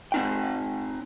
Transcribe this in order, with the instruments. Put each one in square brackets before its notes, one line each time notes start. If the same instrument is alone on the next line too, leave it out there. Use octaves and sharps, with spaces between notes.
[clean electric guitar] C4 D#4 G5